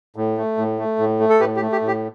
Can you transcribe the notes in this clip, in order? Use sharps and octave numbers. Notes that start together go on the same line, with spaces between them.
A2
A3
A2
A3
A2
A3
A4
A2 G4 B4
G4
A3
G4
A2
G4